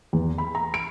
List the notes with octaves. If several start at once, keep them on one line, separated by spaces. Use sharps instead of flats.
E2
B5
A#5
D7